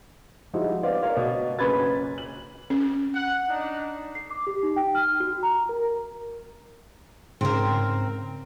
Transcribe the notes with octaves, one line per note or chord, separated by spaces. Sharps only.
F3 G3 G#3 D#4 E4 F#4
B3 C4 D5 F5
A#4 C#5 F5
B2
F#1 C#4 B4 B5 G#6 A6
F#7
C#4
F#5
D4 D#4
C7
D6
G4
D#4
G5
F6
F#4
A#5
A#4
G#2 C#3 C4 A#4